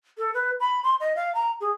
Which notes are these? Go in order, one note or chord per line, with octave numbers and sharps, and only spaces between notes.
A4
B4
B5
C6
D#5
F5
A#5
G#4